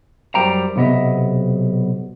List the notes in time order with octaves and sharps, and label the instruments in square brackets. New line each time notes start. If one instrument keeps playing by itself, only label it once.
[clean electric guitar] F#2 G3 C5 G5 A#5
B1 C3 B3 D#5 E5